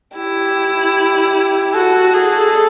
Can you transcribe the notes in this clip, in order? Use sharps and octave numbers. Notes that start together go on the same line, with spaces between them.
E4 G4
F#4 A4
G#4